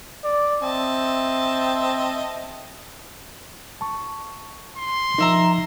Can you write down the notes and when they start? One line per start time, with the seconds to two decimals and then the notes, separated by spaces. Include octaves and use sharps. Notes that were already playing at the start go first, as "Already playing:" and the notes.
0.24 D5
0.62 C4 D#5 E5 A5
3.81 A5 C#6
4.77 C6
5.18 F3 D#4 A#4 E5 A#5